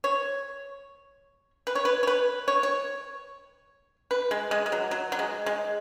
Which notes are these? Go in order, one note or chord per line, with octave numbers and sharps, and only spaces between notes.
C#5
B4
C#5
B4
C#5
B4
C#5
C#5
B4
G#3
G#3
G#3
F#3
F#3
F#3
G#3
G#3